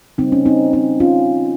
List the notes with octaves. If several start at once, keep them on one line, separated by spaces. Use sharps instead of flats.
C#3 G3 A#3 C4 D#4
C#4
C4 D#4
C4 D#4
C#4 F4